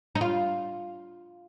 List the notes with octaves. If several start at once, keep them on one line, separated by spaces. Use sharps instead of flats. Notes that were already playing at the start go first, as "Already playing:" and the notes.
D#4
F4